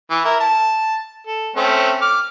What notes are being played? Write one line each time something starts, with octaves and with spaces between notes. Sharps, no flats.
E3
E4 A#4
A5
A4
A3 C4 C#4
D6 F6